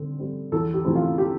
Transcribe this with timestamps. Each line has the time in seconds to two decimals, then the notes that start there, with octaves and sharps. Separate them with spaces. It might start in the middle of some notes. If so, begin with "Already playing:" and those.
Already playing: D3 G3 C4
0.19 G3 C4
0.52 E2 A4
0.74 G4
0.85 C3 E3 A3 C4
0.96 F4
1.18 G4